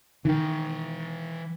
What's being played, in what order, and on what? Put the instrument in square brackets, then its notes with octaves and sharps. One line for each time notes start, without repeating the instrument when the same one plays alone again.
[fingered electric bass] D#3 [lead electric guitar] E3 G5